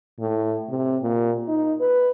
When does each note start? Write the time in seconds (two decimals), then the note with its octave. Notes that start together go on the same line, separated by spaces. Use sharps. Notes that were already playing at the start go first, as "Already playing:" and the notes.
0.19 A2
0.69 C3
1.02 A#2
1.48 D#4
1.80 B4